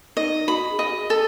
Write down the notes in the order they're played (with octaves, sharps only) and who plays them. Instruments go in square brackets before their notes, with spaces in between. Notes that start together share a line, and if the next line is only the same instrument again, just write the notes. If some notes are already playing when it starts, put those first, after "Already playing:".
[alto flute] D#4 [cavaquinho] D#5
[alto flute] F#4 [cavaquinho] B5
[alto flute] G#4
[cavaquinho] D#5
[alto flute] G#4
[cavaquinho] A4